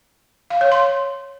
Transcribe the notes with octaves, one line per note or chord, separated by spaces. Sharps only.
F5
C#5
C6